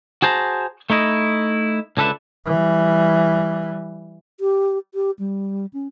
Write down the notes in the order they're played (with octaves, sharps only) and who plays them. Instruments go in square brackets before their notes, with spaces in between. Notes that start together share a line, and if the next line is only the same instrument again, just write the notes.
[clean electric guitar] F#4 G#4 C5 A5 A#5
A3 D#4 E4 D#5
C#2 D3 A4 B4 E5
[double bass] E3 G3
[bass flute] G4
G4
G3
C#4